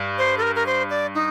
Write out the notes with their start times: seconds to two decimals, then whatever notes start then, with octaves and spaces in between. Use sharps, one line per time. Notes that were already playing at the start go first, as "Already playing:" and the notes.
Already playing: G2
0.18 C5
0.38 A4
0.42 A#4
0.55 A#4
0.66 C5
0.90 D5
1.15 D#4